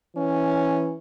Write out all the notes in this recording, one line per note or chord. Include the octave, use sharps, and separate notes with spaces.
E3 C#4